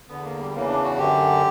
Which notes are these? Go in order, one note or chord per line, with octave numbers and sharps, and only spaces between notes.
E2 D3 B3
A#3
G3
E2 C#3 E3 A#3
D4
F#4
F#2 D3 G4